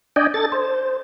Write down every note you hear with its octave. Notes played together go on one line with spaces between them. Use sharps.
D4 D5 D#5 G5 G#5
A4 A6
C5